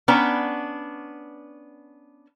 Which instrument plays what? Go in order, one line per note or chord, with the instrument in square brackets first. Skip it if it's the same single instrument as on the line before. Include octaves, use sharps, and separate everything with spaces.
[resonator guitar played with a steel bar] B3 C#4 D4 B4 G5 A#5